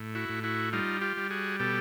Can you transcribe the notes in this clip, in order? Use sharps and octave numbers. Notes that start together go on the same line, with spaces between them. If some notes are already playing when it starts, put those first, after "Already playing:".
Already playing: A2
E4 F#4
A2
E4 F#4
G3 D#4 F4
F4 G4
G3
F#4 G#4
B2 G4 A4